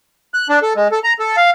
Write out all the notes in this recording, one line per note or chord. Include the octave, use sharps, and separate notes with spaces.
F#6
D4
A4
G#3
A4
A#5
A4
F5